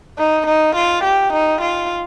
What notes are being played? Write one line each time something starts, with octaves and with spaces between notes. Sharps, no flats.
D#4
D#4
F4
G4
D#4
F4